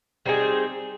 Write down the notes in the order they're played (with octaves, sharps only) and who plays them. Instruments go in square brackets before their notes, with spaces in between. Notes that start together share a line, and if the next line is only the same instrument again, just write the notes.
[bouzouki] G3 C4 D#4 G#4